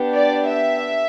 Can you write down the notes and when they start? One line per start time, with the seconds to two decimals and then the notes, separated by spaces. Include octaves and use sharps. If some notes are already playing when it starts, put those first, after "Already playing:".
Already playing: B3 D4 G4
0.14 D5
0.48 E5